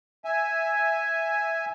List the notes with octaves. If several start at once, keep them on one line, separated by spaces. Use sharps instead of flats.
E5 G#5